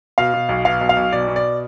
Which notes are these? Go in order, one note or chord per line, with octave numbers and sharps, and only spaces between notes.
B2 F5
B2
B1
B2 F5
B1
F5
B1
B2 D5
B2
D5